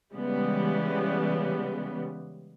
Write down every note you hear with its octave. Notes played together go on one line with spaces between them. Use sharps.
C#3 E3 G3 G#3 B3